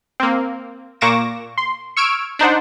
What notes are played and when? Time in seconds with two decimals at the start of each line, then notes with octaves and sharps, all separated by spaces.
0.20 A#3 C4
1.01 A#2 A#3 C#6 D6 A#6 E7
1.58 C6
1.97 C#6 E6 F6 G#6 D7
2.39 D4 D#4 C5 F#5